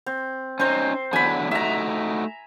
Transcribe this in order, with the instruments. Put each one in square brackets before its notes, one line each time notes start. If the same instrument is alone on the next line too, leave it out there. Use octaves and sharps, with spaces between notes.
[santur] C4
[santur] C4 C5 [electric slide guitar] C#4 D#4
[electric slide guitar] E2 D3 F#3 [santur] G#5 B5
[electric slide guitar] A3 D#4 F#4 [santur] E5 A#5